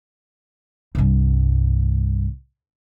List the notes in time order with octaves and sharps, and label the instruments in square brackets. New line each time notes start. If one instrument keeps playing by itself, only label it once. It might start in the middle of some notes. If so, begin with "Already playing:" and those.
[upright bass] C2 G2